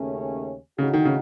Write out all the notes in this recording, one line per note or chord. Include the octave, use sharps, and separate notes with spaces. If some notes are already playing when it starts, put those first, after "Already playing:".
Already playing: D#2 C#3 A3 C#4
A2 C#3 A3 D#4 F#4
D#3
C#3